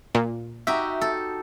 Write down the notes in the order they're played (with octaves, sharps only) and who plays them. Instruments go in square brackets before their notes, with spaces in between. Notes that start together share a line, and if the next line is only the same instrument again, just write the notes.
[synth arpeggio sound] A#2
[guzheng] D#4 F#4 G4 [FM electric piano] E5
[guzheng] A4